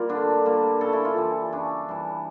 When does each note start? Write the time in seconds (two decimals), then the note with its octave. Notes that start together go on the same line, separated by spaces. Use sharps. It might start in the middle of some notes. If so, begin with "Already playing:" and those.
Already playing: G3 A#3 F4
0.09 D3 D4
0.46 G3 A#3
0.81 C#3 A4
0.93 E4
1.05 F4
1.17 E3 G3
1.53 C#3 D4
1.89 E3 G3